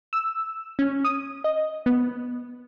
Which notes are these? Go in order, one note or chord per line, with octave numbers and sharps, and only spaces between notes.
E6
C#4
D#6
D#5
B3